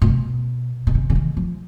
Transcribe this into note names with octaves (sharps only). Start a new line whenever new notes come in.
A#2
B2
B2
C#3
C#3
D#3
F3